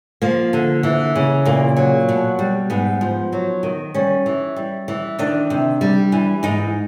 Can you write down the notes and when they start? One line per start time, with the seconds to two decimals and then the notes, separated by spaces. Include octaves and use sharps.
0.22 F3 A#3
0.53 D3
0.83 E3
1.16 C#3
1.45 A#2 A#3
1.77 F#3
2.09 B2
2.39 G3
2.70 G#2 B3
3.01 F3
3.32 F#3
3.63 D#3
3.94 G3 C#4
4.26 E3
4.56 G3
4.88 E3
5.19 D#3 D4
5.50 C3
5.81 G3
6.12 E3
6.43 G#2 D#4